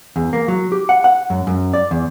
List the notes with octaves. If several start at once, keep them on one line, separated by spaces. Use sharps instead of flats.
E2
A#3
F#3
G4
F#5
F#5
F#2
F#2
D5
E2